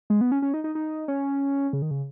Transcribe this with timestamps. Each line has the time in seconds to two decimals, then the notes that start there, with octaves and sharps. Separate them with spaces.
0.10 G#3
0.21 B3
0.32 C#4
0.42 C#4
0.54 D#4
0.64 D#4
0.75 D#4
1.08 C#4
1.73 C#3
1.82 D#3
1.91 C#3